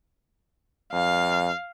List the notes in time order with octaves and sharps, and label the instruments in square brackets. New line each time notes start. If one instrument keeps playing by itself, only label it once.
[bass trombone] F2 [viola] F5